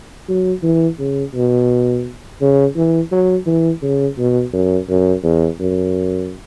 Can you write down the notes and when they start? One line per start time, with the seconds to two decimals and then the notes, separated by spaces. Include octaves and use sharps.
0.28 F#3
0.63 E3
0.99 C#3
1.34 B2
2.41 C#3
2.76 E3
3.12 F#3
3.46 E3
3.82 C#3
4.18 B2
4.53 F#2
4.89 F#2
5.23 E2
5.60 F#2